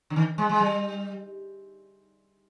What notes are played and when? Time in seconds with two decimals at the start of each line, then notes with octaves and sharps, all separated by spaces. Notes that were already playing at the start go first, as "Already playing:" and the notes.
0.10 D3
0.16 D#3
0.38 G#3
0.49 G#3
0.60 G3